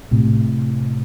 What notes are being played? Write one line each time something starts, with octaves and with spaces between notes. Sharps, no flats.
A2 C3